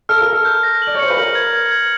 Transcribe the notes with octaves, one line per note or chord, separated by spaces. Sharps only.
A4 F6
A#4
F6
A4
G6
A#6
F#7
D5
C#5
C5 C#7
B4
A#4 F#7
G#6
G#6
G#6